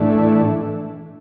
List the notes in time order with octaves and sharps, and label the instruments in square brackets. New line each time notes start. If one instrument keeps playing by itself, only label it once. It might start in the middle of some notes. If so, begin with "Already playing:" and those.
Already playing: [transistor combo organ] A2 E3 A3 D4